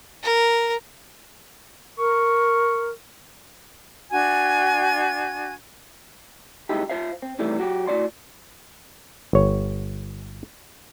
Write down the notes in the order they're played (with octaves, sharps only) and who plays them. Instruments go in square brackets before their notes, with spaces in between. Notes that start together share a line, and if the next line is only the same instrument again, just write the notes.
[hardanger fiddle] A#4
[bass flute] A#4 [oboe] C#6
[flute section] D4 F#4 G#5 G#6
[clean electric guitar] C2 F#2 G#3 D#4 E4 G4
F4 C5 E5 F5
C4
C3 D#3 E3 G3 A3
F#3 F#4 G4
A2 A#3 F#4 D5 C6
[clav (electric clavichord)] G1 C#5